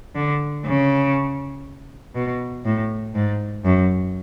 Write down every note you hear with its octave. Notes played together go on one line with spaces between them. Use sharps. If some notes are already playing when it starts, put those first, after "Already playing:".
D3
C#3
B2
A2
G#2
F#2